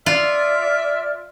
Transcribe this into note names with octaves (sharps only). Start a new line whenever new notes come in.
F4 D5 E5 F6